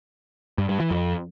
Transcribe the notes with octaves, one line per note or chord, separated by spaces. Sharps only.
G2
G2
E3
F2